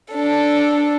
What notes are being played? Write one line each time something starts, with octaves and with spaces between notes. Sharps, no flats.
D4 A4